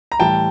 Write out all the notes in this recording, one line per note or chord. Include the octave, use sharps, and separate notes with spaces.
A#5
A2 E3 G3 G5 A5